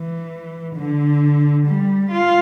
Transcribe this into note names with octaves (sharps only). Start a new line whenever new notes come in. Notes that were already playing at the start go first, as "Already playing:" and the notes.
Already playing: E3
D3
G3
F4